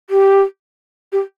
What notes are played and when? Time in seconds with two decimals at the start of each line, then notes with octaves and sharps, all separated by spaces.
0.10 G4
1.12 G4